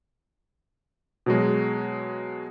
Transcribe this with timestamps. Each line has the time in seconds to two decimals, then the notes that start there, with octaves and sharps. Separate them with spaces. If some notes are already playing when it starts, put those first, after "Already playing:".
1.26 B2 F#3 G#3